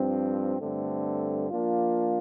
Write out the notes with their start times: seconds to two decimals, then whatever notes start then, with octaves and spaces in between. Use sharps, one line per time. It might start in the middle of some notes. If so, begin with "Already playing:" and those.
Already playing: G2 F3 C4
0.61 G2 D3 A3 C4
1.50 F3 A#3 D4 F4